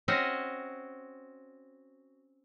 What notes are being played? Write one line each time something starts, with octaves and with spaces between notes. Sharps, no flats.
C4 C#4 F#4 D#5